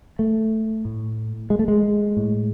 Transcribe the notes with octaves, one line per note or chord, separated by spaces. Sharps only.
A3
A2
G#3
A3
G#3
A2